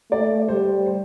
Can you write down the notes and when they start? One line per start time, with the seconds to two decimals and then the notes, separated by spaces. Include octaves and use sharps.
0.11 A3 D5
0.49 G3 C5
0.86 C5